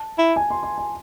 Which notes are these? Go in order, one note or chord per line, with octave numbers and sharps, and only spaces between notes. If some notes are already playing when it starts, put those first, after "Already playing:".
Already playing: A5
E4
G#5
C6
C6
G#5